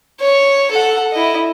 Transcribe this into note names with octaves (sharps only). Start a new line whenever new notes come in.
C#5
A4 F#5
E4 D#5